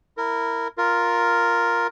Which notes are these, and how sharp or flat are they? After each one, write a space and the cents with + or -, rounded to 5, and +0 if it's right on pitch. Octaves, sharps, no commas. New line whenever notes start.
E4 +0 A#4 -15
F4 +0 A#4 +0